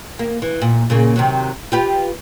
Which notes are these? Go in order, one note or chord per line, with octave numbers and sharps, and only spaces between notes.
A#3
E3
A#2
A#2 C#3 A#3
C3 D#3 F#3
F4 G4 B4